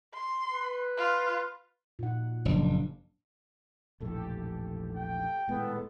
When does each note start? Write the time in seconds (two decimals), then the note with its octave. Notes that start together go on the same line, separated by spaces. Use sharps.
0.14 C6
0.51 B4
0.98 F4
1.99 A#2 D#4 F#5
2.45 F#1 F3 A#3 D4
4.00 E1 A#1 A2 G4 A4
4.96 G5
5.48 D#1 A2 G#3 B3 A4